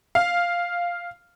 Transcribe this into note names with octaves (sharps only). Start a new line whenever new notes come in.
F5